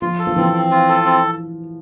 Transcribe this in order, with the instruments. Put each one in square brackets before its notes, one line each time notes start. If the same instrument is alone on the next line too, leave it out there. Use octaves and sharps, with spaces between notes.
[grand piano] F3 [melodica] F4
[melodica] A4
[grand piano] F3
[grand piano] E3 [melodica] C4
[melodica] C4
F4
A4
C4